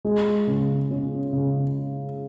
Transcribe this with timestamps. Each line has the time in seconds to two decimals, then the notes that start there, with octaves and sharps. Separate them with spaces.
0.05 G#3
0.47 C#3
0.90 C#4
1.33 C#3